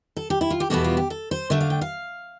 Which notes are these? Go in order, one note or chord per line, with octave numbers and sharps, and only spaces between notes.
A4
G4
E4
F4
G4
E2 B2 G3 B3 E4 A4
F4
G4
A4
C5
D3 A3 D4 E5
F5
G5
F5